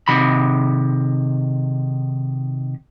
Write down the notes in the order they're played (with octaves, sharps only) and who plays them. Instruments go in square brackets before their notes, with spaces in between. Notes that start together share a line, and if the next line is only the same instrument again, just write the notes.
[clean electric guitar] C3 D#3 B5